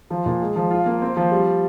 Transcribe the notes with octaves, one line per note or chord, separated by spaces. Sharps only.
F3
A#2
G#3
F3
F4
A#3
C4
F3
G3